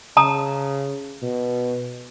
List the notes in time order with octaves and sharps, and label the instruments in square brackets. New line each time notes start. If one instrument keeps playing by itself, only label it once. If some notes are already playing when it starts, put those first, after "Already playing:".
[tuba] C#3 [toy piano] A5 A#5 D#6
[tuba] B2